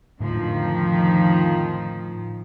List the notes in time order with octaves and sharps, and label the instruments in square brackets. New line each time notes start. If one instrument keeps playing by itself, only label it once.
[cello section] F2 D#3 F3 [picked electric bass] A2 D3